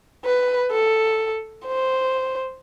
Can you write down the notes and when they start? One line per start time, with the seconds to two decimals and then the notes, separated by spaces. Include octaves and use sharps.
0.25 B4
0.72 A4
1.66 C5